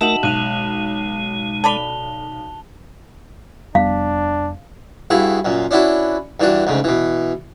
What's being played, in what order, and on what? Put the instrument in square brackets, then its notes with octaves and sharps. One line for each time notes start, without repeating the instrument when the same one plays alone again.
[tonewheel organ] A3 A#4 [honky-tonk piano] D#4 F#4 [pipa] E5 [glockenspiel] A5 E7 F#7
[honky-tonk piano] B1 [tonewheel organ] G#3 [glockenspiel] F#6 D#7 F7
[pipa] A4 D5 B5 [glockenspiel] A5 F7 G7
[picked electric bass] F1 G3 B3 [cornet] D4 [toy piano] F5
[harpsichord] G2 E4 F#4 G#4 F5
F#2 A#2
C#4 D4 E4 F#4 B4
G2 E3 D4 F#4
D2 G#2 C#3
B2 E3